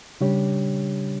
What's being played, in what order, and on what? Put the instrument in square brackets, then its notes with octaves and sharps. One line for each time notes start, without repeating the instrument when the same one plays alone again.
[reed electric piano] C#3 G3 D4 G4 C#5